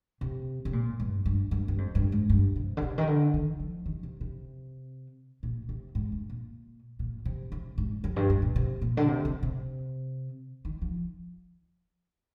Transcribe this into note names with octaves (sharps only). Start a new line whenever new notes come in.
C3
C3
A#2
G2
G2
G2
G2
F2
G2
G#2
G2
C3
D3
C3
D#3
D3
D#3
F3
D#3
C3
C3
A#2
C3
G#2
G2
A#2
A#2
C3
C3
G#2
F2
G2
G2
A#2
C3
A#2
D3
C3
C3
C3
D#3
F3